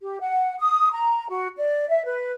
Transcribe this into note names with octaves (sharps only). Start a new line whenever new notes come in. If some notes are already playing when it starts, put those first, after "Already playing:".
G4
F#5
D#6
A#5
F#4
D5
E5
B4